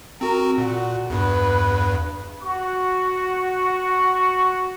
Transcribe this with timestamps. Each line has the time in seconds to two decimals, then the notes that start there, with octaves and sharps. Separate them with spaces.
0.21 C4 F#4 A#4
0.58 A#2 F#4
1.10 E2 G2 B4
2.43 F#4 C#6